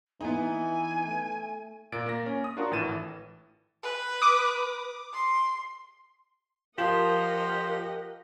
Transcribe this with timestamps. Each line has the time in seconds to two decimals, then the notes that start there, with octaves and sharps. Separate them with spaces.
0.21 E3 B3 D#4 G#5
1.06 A3
1.92 A#2 A6 D7
2.06 A#3 A#6
2.26 C#4
2.44 D#6
2.57 D4 F4 F#4 A#4
2.71 G#1 A2 E3 A6 D#7 E7
3.83 B4
4.22 D6 D#6
5.13 C6
6.78 F3 F4 G4 A#4 D#5 F#5